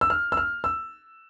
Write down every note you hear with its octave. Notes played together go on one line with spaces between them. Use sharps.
E6
F6
E6
F6
E6